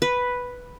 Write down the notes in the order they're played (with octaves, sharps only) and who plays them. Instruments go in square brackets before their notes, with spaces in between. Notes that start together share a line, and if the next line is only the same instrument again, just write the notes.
[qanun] B4